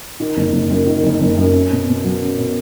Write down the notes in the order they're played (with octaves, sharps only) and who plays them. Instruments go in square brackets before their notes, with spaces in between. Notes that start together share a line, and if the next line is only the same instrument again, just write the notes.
[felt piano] D#3
F#1
F#1
F#2
D#3
F#1
F#1
F#2
C#4
B2
B2
F#3
C#4
B2